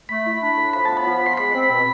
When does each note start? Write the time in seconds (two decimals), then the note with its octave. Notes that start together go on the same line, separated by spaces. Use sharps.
0.09 A3 B5
0.26 E4
0.41 D4
0.57 A2
0.73 F3 B5
0.85 B3 A5
0.97 B5
1.06 F3
1.22 F3 C6
1.37 G#3 B5
1.54 C4
1.70 B2